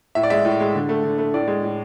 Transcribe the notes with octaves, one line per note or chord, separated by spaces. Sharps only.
A2 E5
D5
G#3 E5
A2
G#3
D3
A3
D3
A3
A2 D5
G#3
A2